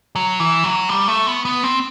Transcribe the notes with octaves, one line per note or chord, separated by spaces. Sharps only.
F#3
E3
F#3
G3
A3
B3
B3
C4